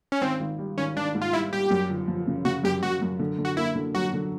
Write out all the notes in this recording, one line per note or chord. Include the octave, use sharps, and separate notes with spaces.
C#4
G#1 C4
G#1
G3
G#1 C#4
G#1 D4
G#2
F4
G3 E4
G3 G4
F#2
G1
F3
C#3
C#3 F#4
F#2 G4
F#2 F#4
F#2
D3
D3
F#4
A#3 E4
D3
F#3 F#4
D3